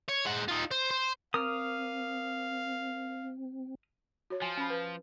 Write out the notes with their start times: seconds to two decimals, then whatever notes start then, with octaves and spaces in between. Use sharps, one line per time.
0.09 C#5
0.25 G#3 F#5
0.48 D#4 F4
0.71 C5
0.91 C5
1.34 C4 A#4 F5 D6 D#6 F6
4.30 F#4 C#5
4.42 F3 G#5
4.57 C#4 B5
4.70 B4